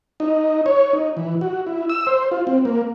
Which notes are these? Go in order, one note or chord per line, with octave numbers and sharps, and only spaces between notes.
D#4
C#5
D#4
E3
F#4
E4
E6
C5
F4
C4
A#3